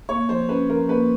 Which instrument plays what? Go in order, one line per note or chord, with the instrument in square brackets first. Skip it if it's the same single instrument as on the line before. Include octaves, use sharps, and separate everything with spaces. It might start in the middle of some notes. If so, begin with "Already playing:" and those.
[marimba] A#3 [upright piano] C#5
[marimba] F3 [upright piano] C5
[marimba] C#4 [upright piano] B4
[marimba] F3 [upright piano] A#4
[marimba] A#3 [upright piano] B4